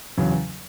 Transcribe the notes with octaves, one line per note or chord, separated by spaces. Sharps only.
E2 C#3 F#3